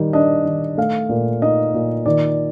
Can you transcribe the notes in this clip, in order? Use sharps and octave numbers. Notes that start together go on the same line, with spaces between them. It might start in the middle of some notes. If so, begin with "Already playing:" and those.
Already playing: D#3 G3
D4 D#5
D#3
A3 F5
A#2
D#4 D#5
A#2
D#3 D5